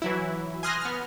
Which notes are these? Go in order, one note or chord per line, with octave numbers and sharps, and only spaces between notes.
E3 F#3 E4
G#5 C6 D#6 F6 F#6 A#6
B3 F6